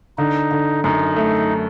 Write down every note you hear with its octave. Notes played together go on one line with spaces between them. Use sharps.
D3 D#4
D3
F#2 D#4
A3